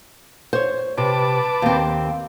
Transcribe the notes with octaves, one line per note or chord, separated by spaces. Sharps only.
C5 C#5
C3 B4 A5 D6
D#2 C4